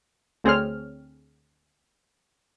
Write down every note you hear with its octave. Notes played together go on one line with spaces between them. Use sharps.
D2 C4 G#4 C#5 F6